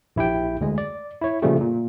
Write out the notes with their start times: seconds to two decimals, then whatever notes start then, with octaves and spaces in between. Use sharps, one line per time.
0.16 A#1 E4 G4 G5
0.61 D2 G#3
0.78 D5
1.21 E4 C#5
1.42 A#2 C#3 F3 G3 A3 G4
1.61 A#2